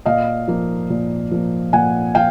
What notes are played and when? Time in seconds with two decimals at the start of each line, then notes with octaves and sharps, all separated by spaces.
0.06 A#2 D#5 F5
0.48 F3 A#3
0.90 A#2
1.31 F3 A#3
1.73 A#2 F#5 G#5
2.15 F3 F5 G5